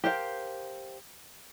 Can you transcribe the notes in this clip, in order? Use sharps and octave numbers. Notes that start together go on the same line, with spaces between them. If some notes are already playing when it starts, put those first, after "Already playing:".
G4 A#4 C5 F5